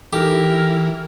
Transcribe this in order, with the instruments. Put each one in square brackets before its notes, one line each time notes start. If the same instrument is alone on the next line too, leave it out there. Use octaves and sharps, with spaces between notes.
[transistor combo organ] E3 [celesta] D#4 A4 D6 [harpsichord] G4 [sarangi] A#4